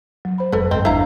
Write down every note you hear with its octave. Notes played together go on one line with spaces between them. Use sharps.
F#3
C5 B5
F1 G#3 A4 B4
G1 F#2 C4 D#5
E2 D4 E4 F5 A#5